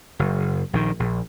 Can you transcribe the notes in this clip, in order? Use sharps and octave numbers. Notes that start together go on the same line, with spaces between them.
F#1
A#1 D#3
A#1